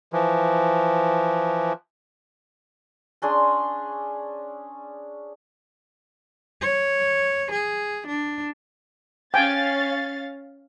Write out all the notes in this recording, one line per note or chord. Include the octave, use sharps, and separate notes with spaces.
E3 F3
C#4 D4 G#4 C6
C#5
G#4
D4
C#4 F5 G5 G#5 A6